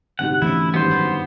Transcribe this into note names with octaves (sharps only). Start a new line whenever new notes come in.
D2 G#2 C3 F#5
E3 A3 C#4 E4
G#1 G2 B3 C5
G1 F#2 F#3